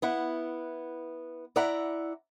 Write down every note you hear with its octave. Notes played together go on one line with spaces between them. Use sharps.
B3 E4 F#5
E4 D5 E5 F#5 A#5